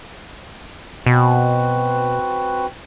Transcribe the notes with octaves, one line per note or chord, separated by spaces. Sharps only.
B2 C4 F#4 B4